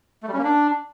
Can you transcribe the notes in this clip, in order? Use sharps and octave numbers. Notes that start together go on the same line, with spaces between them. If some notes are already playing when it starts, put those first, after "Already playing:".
A3
G3
C#4
A#3
D4